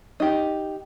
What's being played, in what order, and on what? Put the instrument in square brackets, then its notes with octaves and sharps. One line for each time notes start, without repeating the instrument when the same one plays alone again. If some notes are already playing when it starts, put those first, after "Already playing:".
[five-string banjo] D#4 G4